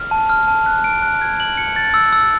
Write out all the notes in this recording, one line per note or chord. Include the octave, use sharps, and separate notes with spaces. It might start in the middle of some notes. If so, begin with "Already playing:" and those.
Already playing: F6
A5
F6
A5
F#6
D7
F#6
G#6
F#7
C#7
A6
E6
E6